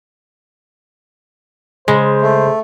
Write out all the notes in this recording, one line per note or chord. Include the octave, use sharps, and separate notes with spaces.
C#3 G#3 C5
A3